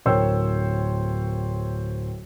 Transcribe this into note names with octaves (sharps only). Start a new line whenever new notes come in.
D1 A#4 C5 C#5 G5 E6